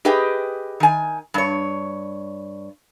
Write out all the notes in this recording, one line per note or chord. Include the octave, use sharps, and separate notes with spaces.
G4 G#4 B4 D#5 G5
D#3 G#5
G2 C#5